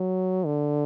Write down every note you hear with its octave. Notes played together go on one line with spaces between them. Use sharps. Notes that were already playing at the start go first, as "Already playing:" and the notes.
Already playing: F#3
D3